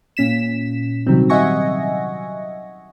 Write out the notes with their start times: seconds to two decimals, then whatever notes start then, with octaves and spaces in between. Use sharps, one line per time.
0.17 A#2 C#4 B6 E7
1.07 C3 D#3 F#3 G3 C4
1.29 D#5 E5 F#5 G#5 C#6 A#6